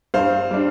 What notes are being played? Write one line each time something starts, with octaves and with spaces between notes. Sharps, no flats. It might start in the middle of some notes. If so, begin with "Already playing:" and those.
G2 C5 F5
G3 D4